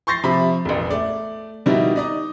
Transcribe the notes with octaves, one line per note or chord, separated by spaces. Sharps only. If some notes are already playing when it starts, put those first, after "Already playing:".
C6 C#6 G6 A6 A#6 C7
C3 F3 E5 B5
E1 A1
A3 D5
B2 D#3 G3 D#4 E4
D#4 D5 D#5